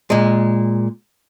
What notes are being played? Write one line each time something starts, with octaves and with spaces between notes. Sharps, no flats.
A#2 G#3